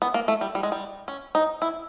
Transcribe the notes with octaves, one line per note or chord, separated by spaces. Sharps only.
B3
A#3
A3
G3
G3
G#3
G3
C#4
D#4
E4